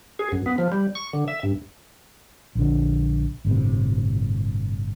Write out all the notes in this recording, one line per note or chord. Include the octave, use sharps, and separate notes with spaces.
G#4
F#2
B3
F3
G3
C#6
D3
E5
G2
A#1 D3
G1 A2 C3